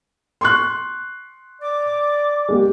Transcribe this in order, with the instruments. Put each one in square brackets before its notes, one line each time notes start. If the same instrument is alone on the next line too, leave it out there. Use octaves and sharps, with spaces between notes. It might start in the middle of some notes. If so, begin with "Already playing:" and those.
[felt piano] C6 C#6 F#6
[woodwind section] D5 D6
[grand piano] G#3 A#3 G4